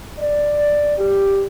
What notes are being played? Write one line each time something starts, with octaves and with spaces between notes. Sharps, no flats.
D5
G4